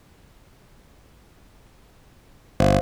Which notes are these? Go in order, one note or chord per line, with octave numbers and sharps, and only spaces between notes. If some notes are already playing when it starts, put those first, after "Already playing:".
G1 C5 E5 F5